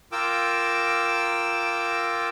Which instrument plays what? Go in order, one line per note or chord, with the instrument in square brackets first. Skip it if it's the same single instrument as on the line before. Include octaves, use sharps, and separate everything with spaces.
[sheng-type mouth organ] F4 A#4 G5 D6 E6